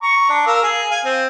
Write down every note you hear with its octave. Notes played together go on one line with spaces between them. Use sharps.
A#5 C#6
D4
A#4 F5 E6
G#4
F5 G#5
C4